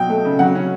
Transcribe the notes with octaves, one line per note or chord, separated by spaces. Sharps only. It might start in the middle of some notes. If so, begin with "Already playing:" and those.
Already playing: B2 F#3 G5
A3
C#3
F#3 F#5
C#4